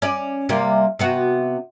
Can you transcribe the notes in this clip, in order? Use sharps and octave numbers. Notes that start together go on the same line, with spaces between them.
C#4 D5
C3 G3 A#3
C3 B3 F#4